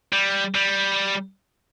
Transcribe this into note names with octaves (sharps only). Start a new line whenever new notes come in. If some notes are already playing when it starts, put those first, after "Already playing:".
G3
G3